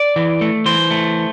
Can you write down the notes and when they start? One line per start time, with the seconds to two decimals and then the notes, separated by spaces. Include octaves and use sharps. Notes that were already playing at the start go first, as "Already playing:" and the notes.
Already playing: D5
0.16 E3
0.41 A3
0.66 E3 C5
0.91 A3